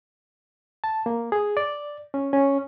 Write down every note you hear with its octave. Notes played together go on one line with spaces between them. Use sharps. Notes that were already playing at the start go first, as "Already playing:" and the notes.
A5
A#3
G#4
D5
C#4
C#4